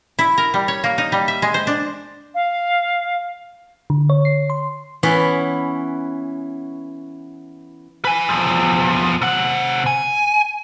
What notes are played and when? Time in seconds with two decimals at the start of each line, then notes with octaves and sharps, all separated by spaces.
0.19 E4
0.38 A#4
0.54 G3
0.68 C#5
0.84 A#3
0.98 D#4
1.12 G3
1.28 E5
1.42 G#3
1.54 C5
1.67 D4
2.35 F5
3.90 D3
4.10 C#5
4.25 C7
4.50 C6
5.03 E3 B3 C#4 E4
8.05 B4 G#5
8.29 E2 F3
9.22 C3 F#5
9.86 G#5